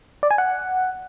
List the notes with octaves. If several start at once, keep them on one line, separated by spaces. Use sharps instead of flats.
D5
G#5
F#5